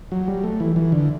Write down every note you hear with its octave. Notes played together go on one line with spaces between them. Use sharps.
F#3
G3
A3
E3
E3
D3